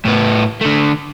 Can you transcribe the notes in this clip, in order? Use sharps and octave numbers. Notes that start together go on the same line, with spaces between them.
A2 B3
D3 A3